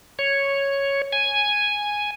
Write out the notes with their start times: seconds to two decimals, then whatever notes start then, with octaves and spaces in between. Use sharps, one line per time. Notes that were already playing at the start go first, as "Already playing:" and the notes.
0.19 C#5
1.13 G#5